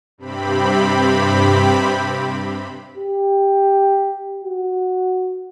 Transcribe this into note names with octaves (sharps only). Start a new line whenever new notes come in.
G2 C3 C4 G4 B5
G4
F#4